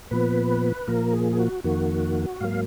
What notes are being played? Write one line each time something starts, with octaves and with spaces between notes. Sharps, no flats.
A#2 F3 B3 B4
A#2 F3 A#3 A#4
G#4
G#4
F#4
F2 D#3 A#3 F#4
G#2 F#3 A#3 F5